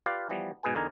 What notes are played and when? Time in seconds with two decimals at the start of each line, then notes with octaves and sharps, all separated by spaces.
0.06 F4 G4 B4 D5 F5
0.29 E3 F3 G3 B3
0.63 G#2 B2 G#4 B4 G#5
0.75 E2 D3 D#4 A#4 G#5